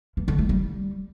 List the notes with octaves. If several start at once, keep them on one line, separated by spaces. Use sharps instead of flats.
E3
D3
A3
G3